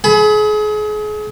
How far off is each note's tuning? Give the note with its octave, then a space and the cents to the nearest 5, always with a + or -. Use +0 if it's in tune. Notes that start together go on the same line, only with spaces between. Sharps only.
G#4 +35 B5 +10